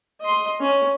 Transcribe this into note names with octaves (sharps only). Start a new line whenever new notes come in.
D#5 C6
C#4